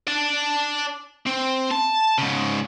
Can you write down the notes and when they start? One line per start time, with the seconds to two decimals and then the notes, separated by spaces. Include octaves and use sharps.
0.08 D5 A5
1.26 C4
1.71 A5
2.18 G#2 C#3